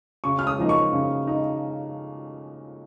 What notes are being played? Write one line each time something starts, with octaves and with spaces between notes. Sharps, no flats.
C#3 C#6
F6
D#6
F3 A#3 D#4
C#6
C#3
D#4